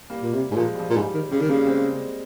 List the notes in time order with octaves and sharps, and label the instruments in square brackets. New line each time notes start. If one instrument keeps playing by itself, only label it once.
[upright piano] G3 A#3
[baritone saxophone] A#2
[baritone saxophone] C3 [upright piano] G3
[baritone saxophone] G#2
[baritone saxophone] A#2 [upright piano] F3 G#3
[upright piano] G3
F3
[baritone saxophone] A#2
[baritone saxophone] G#2 [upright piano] G3
[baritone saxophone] D#3
[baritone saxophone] C#3 [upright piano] G3
[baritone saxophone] D#3
[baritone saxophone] C#3 [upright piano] G3 A#3
[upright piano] G#3 C4